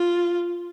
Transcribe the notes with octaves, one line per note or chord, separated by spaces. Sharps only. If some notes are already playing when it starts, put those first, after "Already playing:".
Already playing: F4